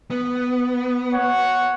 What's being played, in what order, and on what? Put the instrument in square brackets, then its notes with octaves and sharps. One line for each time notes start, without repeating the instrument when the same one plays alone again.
[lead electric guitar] B3
[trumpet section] C#5 F#5